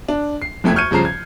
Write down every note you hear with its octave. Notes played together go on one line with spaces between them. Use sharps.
D4
C7
F#1 F2 A3 E5 G#6
C#6 F6 G6 G#6 C#7 D#7
G2 C#3 F3 A#5 C7
G#6